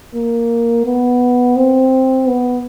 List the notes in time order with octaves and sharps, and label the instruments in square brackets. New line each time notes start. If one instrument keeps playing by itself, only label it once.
[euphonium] A#3
B3
C4
B3